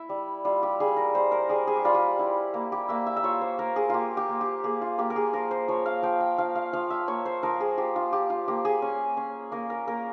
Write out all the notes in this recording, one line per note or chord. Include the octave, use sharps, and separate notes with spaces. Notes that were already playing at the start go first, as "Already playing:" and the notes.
Already playing: E4 E5
G3
G3 F4
G4
G3 G#4
A#4
G3 C5
A#4
G3 G#4
G#4
G4
G3 F4
G4
E4
A#3
G4
A#3 E5
E5
E5
F4 C#5
C5
A#3 A#4
G#4
A#3 F4 G4
G4
A#3
G4
A#3 G#4
F4
A#3 G4
A#4
G#4
F3 A#4
C5
F3 C#5
F5
F3 G5
G5
F3 F5
F5
F3 F5
E5
A#3 C#5
C5
F3 A#4
G#4
F3 G4
F4
F4 G4
F4
A#3 G4
G#4
C#4
C#4
A#3 A#4
A#4
A#3 A#4